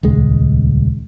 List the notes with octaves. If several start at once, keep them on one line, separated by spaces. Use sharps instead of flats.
D#1 C#2 G#3